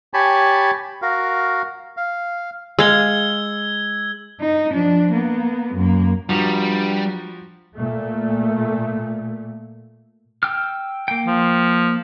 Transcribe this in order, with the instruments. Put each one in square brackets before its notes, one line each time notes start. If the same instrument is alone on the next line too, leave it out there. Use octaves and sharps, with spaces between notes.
[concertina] G4 C#5 G#5 A5 B5
F#4 A#4 F5
F5
[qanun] G#3 F5 [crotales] E6 G#6 G7
[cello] D#4
F3 D4
A#3 B3
F#2 A#3
[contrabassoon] G2 [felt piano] F3 F#4 A#5 [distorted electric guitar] G3
[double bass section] A#2 A3
[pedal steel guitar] G5 E6 F6
A#3 G5
[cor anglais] F3